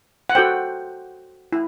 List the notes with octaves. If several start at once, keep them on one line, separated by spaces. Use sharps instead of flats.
F#5
F#4 A4 C5 G5
E4